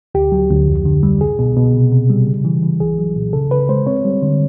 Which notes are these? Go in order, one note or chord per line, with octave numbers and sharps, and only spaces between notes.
D2 G4
F#3
D2
F2
D3
G3
C2 G#4
B2
B2
C3
C3
G3
C#3
E3
E3
C2 G#4
F#3
A#2
C#3 A4
C#3 B4
G#3 C5
C4 C#5
G3
D3